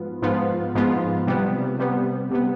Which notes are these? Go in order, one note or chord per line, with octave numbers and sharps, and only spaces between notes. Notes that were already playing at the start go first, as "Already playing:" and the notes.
Already playing: G#2 F3 B3 F4
G#2 F3 B3 F4
G#2 F3 B3 F4
C3 G3 B3
C3 G3 B3
C3 G3 B3